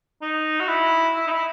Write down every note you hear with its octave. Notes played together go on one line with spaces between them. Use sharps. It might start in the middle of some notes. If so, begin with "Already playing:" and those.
D#4
F#4
E4
E4
D#4
E4